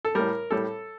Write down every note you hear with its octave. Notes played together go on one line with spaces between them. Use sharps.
A4
A2 G3 A#4
A2 G3 A4